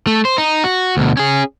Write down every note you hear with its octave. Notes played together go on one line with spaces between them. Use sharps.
A3
C5
D#4
F#4
D2 B2
C#4 G#4